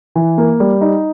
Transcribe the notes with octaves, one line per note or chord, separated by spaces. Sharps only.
E3
A#3
G3
D#4